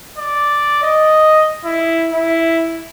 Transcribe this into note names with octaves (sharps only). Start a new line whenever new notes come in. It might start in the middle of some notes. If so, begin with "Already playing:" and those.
D5
D#5
E4
E4